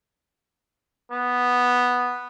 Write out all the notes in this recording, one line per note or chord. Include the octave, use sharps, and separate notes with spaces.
B3